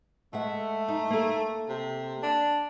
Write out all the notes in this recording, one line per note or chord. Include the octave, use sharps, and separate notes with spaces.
G#3 A3 E5 F#5
D#4
A#3 A4
C3
D4